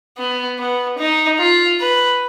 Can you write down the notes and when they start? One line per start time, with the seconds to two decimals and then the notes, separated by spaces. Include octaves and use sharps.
0.18 B3
0.59 B3
0.99 D#4
1.39 F4
1.80 B4